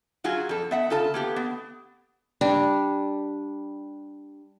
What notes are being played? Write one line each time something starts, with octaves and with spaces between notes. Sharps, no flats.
F#3 F4 F#4 G#4
F2 A4
B3 E5 F#5
C#3 F4 A4 A5
A#3 B3 G4
B3
G3 D4